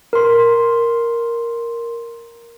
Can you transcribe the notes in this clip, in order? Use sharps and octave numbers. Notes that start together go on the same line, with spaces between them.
A#4 C6